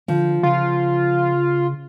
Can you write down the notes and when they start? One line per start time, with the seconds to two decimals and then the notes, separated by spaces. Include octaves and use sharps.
0.08 D3 F3
0.43 C#3 F4